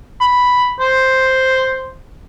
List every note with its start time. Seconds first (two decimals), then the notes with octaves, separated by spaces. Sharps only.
0.20 B5
0.80 C5